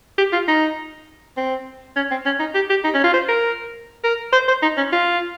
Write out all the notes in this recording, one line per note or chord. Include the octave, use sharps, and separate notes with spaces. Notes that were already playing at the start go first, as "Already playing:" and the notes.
G4
F4
D#4
C4
C#4
C4
C#4
D#4
G4
G4
D#4
C#4
F4
C5
A#4
A#4
C5
C5
D#4
C#4
F4